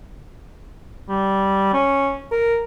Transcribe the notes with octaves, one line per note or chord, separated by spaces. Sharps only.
G3
C#4
A#4